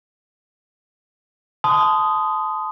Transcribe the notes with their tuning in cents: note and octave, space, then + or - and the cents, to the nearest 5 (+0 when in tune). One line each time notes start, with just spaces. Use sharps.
A5 -20 C6 -30 D#6 +0